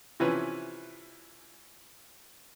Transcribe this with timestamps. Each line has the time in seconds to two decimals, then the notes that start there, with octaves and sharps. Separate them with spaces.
0.20 C3 E3 F3 C#4 B4